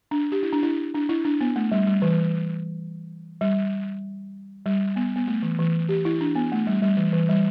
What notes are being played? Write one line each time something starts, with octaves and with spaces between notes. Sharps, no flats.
D4
G4
E4
D4
E4
D4
E4
D4
B3
A3
G3
G3
E3
G3
G3
B3
B3
A3
E3
E3
G4
E4
D4
B3
A3
G3
G3
E3
E3
G3